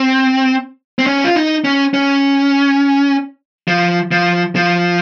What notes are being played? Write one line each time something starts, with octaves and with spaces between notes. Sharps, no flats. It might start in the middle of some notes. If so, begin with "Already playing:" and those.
Already playing: C4
C4
C#4
F4
D#4
C#4
C#4
F3
F3
F3